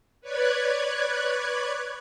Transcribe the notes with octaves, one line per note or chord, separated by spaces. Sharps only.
B4 C#5 D5 F#6 G#6